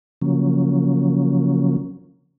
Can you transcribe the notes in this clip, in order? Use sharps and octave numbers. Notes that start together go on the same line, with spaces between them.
C#3 F3 F#3 A#3 C#4